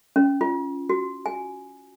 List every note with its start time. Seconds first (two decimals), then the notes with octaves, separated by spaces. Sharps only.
0.16 C#4
0.41 F4
0.89 F#4
1.26 G#5